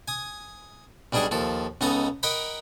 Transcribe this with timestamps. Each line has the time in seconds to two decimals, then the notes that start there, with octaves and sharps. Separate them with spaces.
0.08 G#5 D#6
1.13 B1 G3 D4 G#4 D#5 C#6
1.31 D#2 F3 A4
1.81 C#2 B3 D#4 A4 D#5 A#5
2.23 A#4 D#5 F#5 G5 A#5 B5